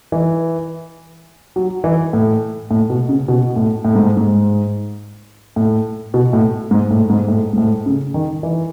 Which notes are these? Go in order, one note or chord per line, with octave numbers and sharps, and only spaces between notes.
E3
F#3
E3
A2
A2
B2
C#3
B2
A2
A2
G#2
G#2
A2
B2
A2
G#2
A2
G#2
A2
G#2
A2
C#3
D#3
E3